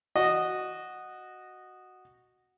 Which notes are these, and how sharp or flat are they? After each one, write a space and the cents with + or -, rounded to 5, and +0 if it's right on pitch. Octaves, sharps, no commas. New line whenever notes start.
F#4 +0 D#5 -10